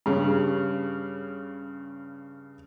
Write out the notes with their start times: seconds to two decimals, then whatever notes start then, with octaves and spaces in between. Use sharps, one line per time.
0.06 G2 C#3